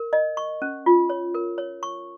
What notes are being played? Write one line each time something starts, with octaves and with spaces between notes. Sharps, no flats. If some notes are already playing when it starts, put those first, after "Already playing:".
Already playing: A#4
D#5
C#6
C#4
F4
C#5
A#4
C#5
C#6